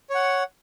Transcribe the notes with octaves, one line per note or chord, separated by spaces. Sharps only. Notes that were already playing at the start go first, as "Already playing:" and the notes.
C#5 F#5